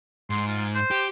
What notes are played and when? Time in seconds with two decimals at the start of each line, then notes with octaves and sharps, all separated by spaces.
0.30 G#2 C6
0.48 F4
0.75 C5
0.91 G4